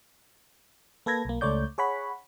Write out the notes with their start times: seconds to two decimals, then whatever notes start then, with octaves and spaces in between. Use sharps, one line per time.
1.06 A#3 A4 B4 G#6 A#6
1.25 B1 A#3
1.41 C#2 A3 C#5 D5 G6
1.78 G#4 C#5 F#5 B5